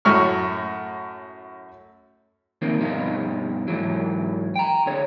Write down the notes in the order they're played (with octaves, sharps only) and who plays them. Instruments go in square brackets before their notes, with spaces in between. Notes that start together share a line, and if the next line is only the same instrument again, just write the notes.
[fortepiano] F#2 A2 C#5 C#6 F6
[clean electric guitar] D#3 F3 A#3 C4
G2 B2 F3 D#4 F4
G#2 E3 F#3
G5 A#5
D3 C#5